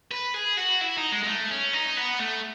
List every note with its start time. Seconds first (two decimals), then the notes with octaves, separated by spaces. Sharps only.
0.11 B4
0.34 G#4
0.57 F#4
0.81 E4
0.97 D#4
1.12 G#3
1.23 G#3
1.27 A3
1.51 C#4
1.73 D#4
1.97 B3
2.19 A3